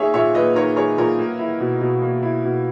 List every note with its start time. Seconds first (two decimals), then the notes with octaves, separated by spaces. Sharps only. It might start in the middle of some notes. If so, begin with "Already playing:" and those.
Already playing: A#3 D#4 G#4 C#5 E5
0.14 A#2 C#5 E5
0.34 A#3 B4 D#5
0.55 D#4 A#4 C#5
0.76 G#4 A#4 C#5
0.98 A#2 A#4 C#5
1.19 A#3
1.39 E4
1.60 B2
1.81 B2
2.02 A#3
2.23 E4
2.44 B2